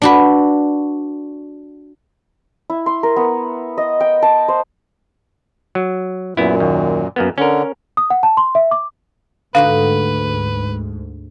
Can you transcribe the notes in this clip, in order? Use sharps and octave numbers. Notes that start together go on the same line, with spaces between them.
D4 F#4 B4
E4
C6
A#4
B3
D#5
G5
A5
C5
F#3
F#2 A#2 B3 E4
D#2
F#2 A#3 B3
D3 C#4 A#4
D#6
F#5
A5
C6
E5
D6
D2 G#2 D3 D#4 F#4 B4 F5